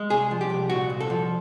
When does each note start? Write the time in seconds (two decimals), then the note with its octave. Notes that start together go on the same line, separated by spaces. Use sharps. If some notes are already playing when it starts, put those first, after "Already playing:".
Already playing: G#3
0.10 C2 G#4
0.31 F3
0.41 G4
0.50 C2
0.70 A#2 F#4
0.90 C2
1.00 A4
1.10 F3